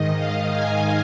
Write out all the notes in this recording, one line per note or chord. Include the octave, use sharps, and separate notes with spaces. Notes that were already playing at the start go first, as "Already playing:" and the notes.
Already playing: G#2 D#3 D#5
F5
G#5